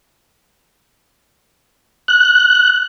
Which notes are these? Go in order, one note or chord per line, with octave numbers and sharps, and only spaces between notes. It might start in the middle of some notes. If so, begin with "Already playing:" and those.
F#6